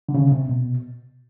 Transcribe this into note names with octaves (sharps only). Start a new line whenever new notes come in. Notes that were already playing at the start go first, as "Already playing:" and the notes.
D3
C#3
C3
B2